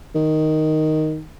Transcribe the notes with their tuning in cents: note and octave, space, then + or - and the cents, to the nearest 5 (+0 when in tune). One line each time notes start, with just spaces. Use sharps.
D#3 +0